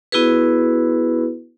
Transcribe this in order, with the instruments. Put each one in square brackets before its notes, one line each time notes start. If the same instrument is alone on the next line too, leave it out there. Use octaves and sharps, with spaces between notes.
[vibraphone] B3 E4 F#4 G#4 B4